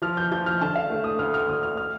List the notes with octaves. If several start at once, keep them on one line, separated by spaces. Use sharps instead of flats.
F3 F6
G6
F3 G6
F6
D3 A5
F5
A3
D#6
D2 F6
F6
D2 D#6
F6
F6